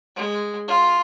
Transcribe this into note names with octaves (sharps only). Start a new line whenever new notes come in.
G#3
F4